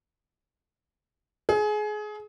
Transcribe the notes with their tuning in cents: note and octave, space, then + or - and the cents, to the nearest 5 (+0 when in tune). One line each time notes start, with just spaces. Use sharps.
G#4 +25